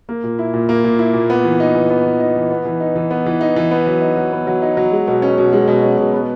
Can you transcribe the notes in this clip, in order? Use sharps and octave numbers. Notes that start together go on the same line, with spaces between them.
A#3
A#2
E4
A#2
A#3
A#2
E4
A#2
B3
E3
D#4
E3
B3
E3
D#4
E3
B3
E3
D#4
E3
B3
E3
D#4
E3
B3
F#3
D#4
F#3
B3
F#3
D#4
F#3
G#3
B2
C#4
B2
G#3
B2
C#4
B2
B3